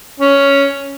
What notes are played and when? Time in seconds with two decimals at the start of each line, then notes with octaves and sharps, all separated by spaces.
0.20 C#4